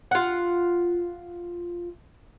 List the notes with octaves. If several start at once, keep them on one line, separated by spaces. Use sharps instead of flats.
F4 F#5